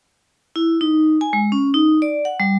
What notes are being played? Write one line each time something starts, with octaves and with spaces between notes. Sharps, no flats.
E4
D#4
G#5
G#3
C#4
D#4
D5
F#5
G3